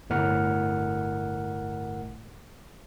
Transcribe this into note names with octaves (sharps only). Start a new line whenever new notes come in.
G1 A2 A#4 F#5 F6